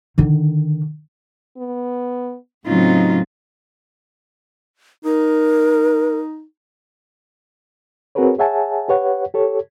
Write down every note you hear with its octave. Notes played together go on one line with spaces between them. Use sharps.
D3 D#3
B3
A2 C#3 F#3 C4 D#4 F4
D#4 A#4
C4 F#4 G#4 A#4 B4 C#5
G#4 C#5 E5 F#5 G#5 A5
G4 B4 C#5 F#5
G4 A4 C#5